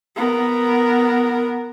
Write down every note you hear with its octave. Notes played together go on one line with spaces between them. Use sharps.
B3 A#4